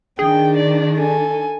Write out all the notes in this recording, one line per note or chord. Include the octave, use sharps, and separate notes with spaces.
D#3 D4 G#4 G5
D5
A4 G#5